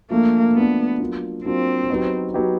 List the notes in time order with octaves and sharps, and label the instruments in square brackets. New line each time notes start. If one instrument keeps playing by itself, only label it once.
[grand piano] F3 A3 D4 [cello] A#3
[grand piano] F3 A3 D4 [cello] B3
[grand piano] F#3 A#3 D4 F4
[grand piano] F#3 A#3 D4 F4 [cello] C4
[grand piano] F#3 B3 D#4 G4 B4
F#3 B3 D#4 G4 B4